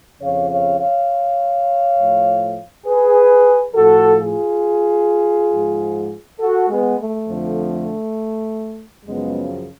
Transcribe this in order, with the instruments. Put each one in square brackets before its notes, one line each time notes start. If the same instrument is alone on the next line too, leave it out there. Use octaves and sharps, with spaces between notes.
[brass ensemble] F2 C#3 F3 C#5 F5
C#5 F5
C#5 F5
A2 F3
G#4 B4
A2 F3 F#4 A4
F4 G#4
G#2 F3
F#4 A4
G#3 B3
A3
F2 D3 F3
F#2 C#3 F3 G#3 B3